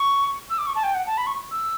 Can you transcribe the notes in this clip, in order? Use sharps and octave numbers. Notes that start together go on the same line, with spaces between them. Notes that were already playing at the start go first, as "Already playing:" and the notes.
Already playing: C#6
E6
D6
C#6
A5
G5
F#5
A5
B5
C#6
E6